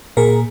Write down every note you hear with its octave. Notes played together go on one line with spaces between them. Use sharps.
A#2 G#4 A#4